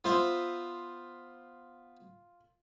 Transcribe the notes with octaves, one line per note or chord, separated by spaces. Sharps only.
B3 F4 C5 E5